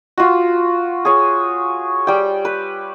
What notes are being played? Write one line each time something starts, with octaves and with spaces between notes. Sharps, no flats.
F4 F#4
G#4 C#5
G3 G5
B4